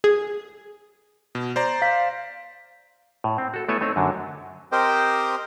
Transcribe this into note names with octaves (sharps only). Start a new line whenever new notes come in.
G#4
B2
C5 D5 A#5
F5 B6
A2
C4
F#4 A4
A3 B3 E4 A4 C#5 G#5
A3 C4 D#4 C#5
F#2 D3 F#3
C4 G4 A#4 C5 D#5 G5